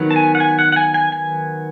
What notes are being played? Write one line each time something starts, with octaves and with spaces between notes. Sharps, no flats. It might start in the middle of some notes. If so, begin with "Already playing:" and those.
Already playing: D#3 F#3 B3
A5
G#5
F#5
G#5
F#5
F#5
G#5
G#5
G#5